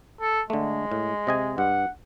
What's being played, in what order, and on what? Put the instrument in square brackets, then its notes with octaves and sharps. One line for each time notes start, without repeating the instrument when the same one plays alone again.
[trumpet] A4
[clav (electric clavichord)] D3 A3 [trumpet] G#3
[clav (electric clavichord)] A2
C3 D#5 G#5
[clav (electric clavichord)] G2 [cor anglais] F#5